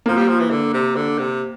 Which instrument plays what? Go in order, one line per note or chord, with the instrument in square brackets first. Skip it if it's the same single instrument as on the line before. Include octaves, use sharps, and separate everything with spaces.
[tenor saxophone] F3 [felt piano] A#3
[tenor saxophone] G3
F3
E3
D3
C3
D3
C3